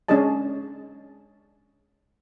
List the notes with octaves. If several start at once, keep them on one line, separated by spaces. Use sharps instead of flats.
G#3 C#4 D4 G#4 D#5 A5